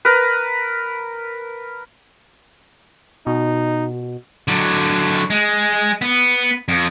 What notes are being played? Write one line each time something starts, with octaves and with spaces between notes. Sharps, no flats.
A#4 B4
B2 D#4
D3 F#3
G#3
B3
F2